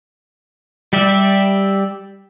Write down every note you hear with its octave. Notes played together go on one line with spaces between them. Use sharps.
G3 G4 D5 E5